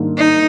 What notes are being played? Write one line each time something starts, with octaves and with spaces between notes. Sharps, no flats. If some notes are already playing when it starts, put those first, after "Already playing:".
Already playing: G#2 D#3 G3 A#3 D4
D#4